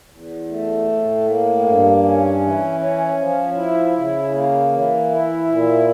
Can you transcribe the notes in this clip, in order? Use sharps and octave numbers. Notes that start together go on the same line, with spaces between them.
E2
A3
A2
A#3
G2
C#4
E3
C#4
F3
E4
C#3
A#3
E3
E4
A#2